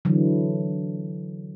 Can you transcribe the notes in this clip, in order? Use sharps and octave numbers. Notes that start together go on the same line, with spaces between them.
D3 E3 F#3